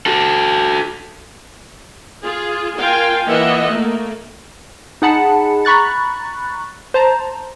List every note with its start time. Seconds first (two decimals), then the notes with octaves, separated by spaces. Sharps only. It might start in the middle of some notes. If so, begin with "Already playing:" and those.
0.06 F#4 A4
2.22 F4 G#4
2.79 F4 A#4 F5 G5 G#5 C6
3.27 E3 A#3 F4 D#5 E5 F#5
3.68 A3 A#3
5.02 D#4 G#4 F#5 A5 B5 C#7
5.65 A#5 B5 C#6 F#6 A6
6.94 C5 A5 A#5